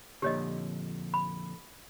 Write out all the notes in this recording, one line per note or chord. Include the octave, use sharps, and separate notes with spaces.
F2 A#2 D3 G4 C#5 D#5
B5